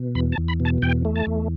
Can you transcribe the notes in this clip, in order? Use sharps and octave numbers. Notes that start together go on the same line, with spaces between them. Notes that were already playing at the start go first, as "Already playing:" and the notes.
Already playing: B2
E2 B5
A5
E2
B5
B2
A5
E2 G5
A3
A5
E2